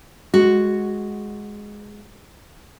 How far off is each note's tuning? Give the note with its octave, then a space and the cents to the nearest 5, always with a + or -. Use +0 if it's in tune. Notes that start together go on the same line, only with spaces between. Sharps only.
G#3 +0 F#4 +0